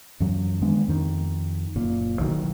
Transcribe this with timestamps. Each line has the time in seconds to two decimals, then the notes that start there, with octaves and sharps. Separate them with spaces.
0.20 F#2 E3 F#3
0.62 D#3 G#3 B3 D4
0.88 F2 D#3
1.76 F#1 A#2
2.20 B1 D#3 E3 F#3